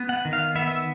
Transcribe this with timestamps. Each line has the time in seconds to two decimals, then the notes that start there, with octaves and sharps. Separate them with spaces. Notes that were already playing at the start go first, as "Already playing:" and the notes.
Already playing: B3
0.09 F#5
0.25 D#3
0.33 F5
0.55 B3 E5
0.68 E5